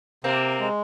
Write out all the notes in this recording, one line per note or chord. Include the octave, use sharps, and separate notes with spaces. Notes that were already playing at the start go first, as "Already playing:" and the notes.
C3 A#3 C4
G#3